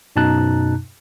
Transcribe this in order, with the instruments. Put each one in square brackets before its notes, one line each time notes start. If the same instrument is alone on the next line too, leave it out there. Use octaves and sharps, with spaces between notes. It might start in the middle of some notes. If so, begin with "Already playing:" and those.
[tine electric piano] F#2 B2 D#4 A5 A#5 F#6